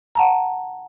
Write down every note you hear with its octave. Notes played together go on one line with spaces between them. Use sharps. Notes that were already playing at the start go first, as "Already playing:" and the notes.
F#5 A5 A#5